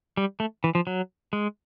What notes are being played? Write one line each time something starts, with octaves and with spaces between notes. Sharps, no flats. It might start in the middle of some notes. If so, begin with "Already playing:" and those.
G3
A3
E3
F3
F#3
G#3